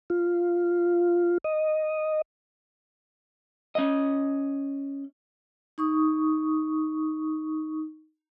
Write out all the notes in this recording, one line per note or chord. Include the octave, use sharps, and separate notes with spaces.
F4
D#5
C#4 D#5
D#4 C#6 D#6